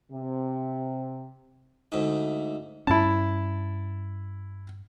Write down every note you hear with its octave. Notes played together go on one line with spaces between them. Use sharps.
C3
D2 G#2
G2 C#4 E4 A5